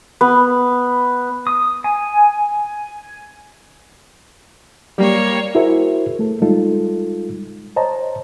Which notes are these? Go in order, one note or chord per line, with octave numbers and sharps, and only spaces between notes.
B3
D#6
G#5
G3 A#3 C#5
E4 F#4 G#4 A#4 C5 E5
A3 A4
G3 G#3 D#4 F4 A4
C5 C#5 D#5 A5 A#5